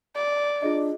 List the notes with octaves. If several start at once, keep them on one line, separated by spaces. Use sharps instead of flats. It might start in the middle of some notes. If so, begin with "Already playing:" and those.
D5
D4 F4 G#4 D#5